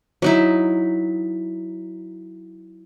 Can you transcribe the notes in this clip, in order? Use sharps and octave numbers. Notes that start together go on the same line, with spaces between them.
F#3 D#4 E4